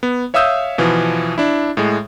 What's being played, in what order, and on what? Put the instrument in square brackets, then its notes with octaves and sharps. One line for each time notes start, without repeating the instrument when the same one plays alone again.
[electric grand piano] B3
C#5 E5 F5 D#6 E6 G6
B2 E3 F3 B3
D4 E4
A2 G#3